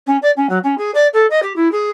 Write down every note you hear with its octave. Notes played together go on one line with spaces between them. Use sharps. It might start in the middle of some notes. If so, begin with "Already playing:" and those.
C#4
D5
C#4
F#3
C#4
G#4
D5
A4
D#5
G4
E4
G#4